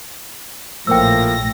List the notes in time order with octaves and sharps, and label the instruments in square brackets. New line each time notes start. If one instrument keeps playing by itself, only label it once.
[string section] A#1 A2 A#6 [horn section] F3 A#3 [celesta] G5 E6